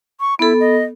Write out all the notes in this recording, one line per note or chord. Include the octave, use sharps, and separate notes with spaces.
C#6
B3 E4 A4
D#5